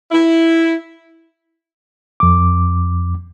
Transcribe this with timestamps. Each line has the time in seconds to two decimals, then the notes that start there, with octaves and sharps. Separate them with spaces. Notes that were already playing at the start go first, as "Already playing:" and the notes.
0.12 E4
2.20 F2 D6